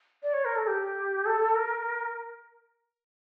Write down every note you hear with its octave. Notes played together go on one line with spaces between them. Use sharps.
D5
C#5
A#4
A4
G4
A4
A#4